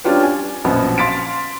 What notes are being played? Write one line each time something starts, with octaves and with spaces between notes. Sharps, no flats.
G3 C#4 D4 F4 G4 B4
G#5
A#1 F#2 B2 F3 B3
F5 C6 A6 B6 D7